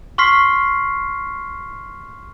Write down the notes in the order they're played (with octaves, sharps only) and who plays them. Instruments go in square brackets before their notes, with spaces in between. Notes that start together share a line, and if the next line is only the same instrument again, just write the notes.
[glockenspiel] C6 C#6 F6 B6 C7